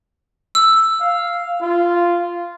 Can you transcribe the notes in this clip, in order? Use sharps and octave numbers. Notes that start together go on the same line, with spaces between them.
E6
F5
F4